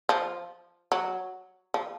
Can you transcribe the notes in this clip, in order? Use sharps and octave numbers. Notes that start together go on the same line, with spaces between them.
F3
F#3
F3